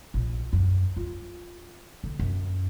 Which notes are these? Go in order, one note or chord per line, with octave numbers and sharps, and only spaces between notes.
A#1
F#2
F4
D3
F#2